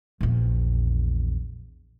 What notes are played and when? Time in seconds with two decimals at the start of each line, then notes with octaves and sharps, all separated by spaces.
0.21 A#1 E2